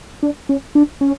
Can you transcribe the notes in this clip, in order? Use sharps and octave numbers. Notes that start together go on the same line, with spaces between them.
D4
C#4
D4
C#4